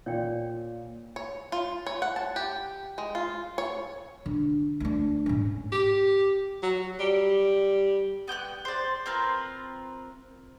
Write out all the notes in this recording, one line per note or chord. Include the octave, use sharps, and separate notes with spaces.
A#2 C#5 D5 G5
C#5
F4
C#5
F#5
A5
G4
G#3
F4
C#5
D3
D2 D4
G#2 C#4
G4
F#3
G3
B3 G5 D6 F#6
C5 D5
C4 F4 A#4 B4